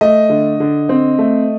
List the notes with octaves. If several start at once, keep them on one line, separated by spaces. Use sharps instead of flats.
A3 D#5
D3
D3
C4
A3